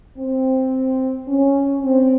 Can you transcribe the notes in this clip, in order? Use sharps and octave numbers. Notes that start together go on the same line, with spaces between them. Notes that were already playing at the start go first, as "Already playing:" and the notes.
C4
C#4
C4